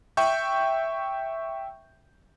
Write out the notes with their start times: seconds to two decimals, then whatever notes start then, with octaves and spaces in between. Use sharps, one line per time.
0.17 E5 G5 C#6 G6